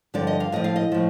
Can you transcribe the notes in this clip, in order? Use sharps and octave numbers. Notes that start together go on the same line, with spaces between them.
G2 D3 F3 D5
D#5
F5
A2 F3 D#5
F5
D#5
A2 F3